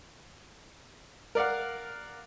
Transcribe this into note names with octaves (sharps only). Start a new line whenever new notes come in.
A#4 D5 F5 F#5